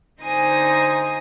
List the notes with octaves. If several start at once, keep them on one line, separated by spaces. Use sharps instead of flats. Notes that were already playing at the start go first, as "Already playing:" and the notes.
D3 D#4 C5 G#5 D#6 A#6